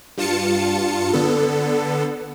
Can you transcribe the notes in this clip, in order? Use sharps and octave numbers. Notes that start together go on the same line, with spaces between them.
G2 F4 A5 C#7
D3 B3 A4